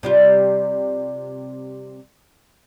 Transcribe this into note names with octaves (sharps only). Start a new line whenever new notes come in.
C3 G3 F4